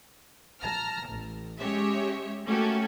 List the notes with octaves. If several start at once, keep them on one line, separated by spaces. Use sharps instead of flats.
A5 A#5 F6
A1
G#3 C#4 G4 C#5 E5
A3 A#3 C#4 F#4 G4 A4